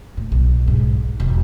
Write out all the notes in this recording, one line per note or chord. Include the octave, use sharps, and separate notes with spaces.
A2
B1
G#2
E1